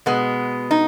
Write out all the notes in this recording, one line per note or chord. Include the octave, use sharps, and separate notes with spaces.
B2 G#3 B3
D#4